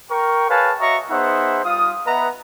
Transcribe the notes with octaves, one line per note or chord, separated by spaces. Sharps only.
A#4 G5 C#6
G#4 B4 C#5 F5 G#5 A5
F#4 C#5 D#5 E5 A#5 C#6
B3 D#4 G#4 C5 E5 F#5
G3 F4 F5 D#6
B3 B4 D#5 E5 F#5 A#5